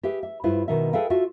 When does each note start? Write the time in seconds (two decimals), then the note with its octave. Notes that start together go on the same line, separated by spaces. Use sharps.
0.03 G4 G#4 B4 E5
0.23 E5
0.44 G2 E4 F4 B4 C5
0.68 B2 D#3 D#4 E5
0.93 G#4 A4 B4 E5 F5 G5
1.10 F4 F#4 A4 E5